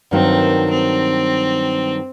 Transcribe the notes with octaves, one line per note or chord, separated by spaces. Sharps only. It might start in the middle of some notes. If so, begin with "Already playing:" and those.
G2 D#3 F#3 A#3 C4
C4